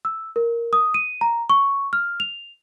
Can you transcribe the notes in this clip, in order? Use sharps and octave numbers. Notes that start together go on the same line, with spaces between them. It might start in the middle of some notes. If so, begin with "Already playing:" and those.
E6
A#4
D#6
D#7
A#5
C#6
F6
F7